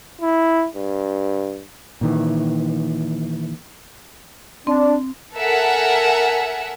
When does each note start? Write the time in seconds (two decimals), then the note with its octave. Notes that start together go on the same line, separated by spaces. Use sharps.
0.21 E4
0.76 G2
2.01 A#2 D#3 E3
4.67 C4 D4
5.35 A4 A#4 E5 F#5 G#5